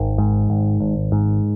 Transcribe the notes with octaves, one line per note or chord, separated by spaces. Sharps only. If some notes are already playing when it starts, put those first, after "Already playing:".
Already playing: G#1 D#3
G#2
G#1
G#1
G#2